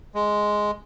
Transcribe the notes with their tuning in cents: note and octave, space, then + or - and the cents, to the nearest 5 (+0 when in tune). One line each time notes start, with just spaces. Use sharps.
G#3 +5